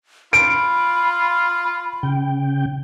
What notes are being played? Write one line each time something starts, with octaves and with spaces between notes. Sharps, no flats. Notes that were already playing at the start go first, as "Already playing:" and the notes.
F4 B5 D7
C#3 G5